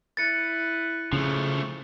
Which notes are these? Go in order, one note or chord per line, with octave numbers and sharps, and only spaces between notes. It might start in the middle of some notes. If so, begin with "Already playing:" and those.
E4 B4 A6 C#7
C#3 F3 A3